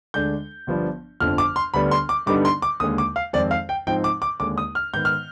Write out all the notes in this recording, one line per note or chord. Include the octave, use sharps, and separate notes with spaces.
D2 D3 G#3 D4 G6
G1 G2 F3 B3 D4
G1 F2 D3 F3 F6
D6
C6
D2 D3 G3 B3 D4 B5
C6
D6
G2 D3 G3 B3 D#4 D6
C6
D6
D#2 D3 G#3 D#6
D6
F5
F2 D#3 G#3 C4 D5
F5
G5
G#2 F3 C4 D#4 G5
D6
D6
D#2 D3 G#3 D4 D6
D#6
F6
G#2 D#3 B3 G6
F6